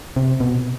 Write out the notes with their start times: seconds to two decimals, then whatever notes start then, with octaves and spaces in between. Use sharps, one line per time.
0.16 C3
0.40 B2